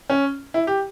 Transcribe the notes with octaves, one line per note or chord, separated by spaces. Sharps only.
C#4
E4
G4